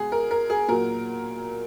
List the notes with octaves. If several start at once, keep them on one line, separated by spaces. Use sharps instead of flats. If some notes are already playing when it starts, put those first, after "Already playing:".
Already playing: B2 G#3 G#4
A#4
A#4
G#4
A#2 F#3 A#4